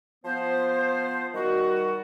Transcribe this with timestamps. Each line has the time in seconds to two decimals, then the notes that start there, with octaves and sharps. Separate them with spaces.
0.25 F3 B3 C5
1.34 D#3 G3 F#4